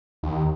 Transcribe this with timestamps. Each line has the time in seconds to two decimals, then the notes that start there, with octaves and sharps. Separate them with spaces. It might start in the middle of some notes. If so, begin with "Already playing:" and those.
0.23 D#2